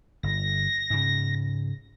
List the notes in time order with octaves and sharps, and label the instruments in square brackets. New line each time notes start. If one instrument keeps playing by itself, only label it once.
[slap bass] G1 [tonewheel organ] A#6
[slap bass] G#2 C#3